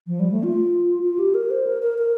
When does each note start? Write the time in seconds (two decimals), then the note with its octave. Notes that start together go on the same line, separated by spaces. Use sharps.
0.07 F3
0.20 G3
0.32 A3
0.43 F4
1.03 F4
1.19 G4
1.34 A#4
1.50 C5
1.67 A#4
1.82 A#4
1.98 A#4